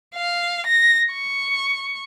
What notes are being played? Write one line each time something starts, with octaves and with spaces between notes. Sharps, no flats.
F5
A#6
C#6